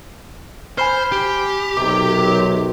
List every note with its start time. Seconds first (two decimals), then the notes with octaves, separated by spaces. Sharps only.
0.78 C5 G#5 B5 F6
1.12 G4
1.77 B1 C3 D#3 F#3 D6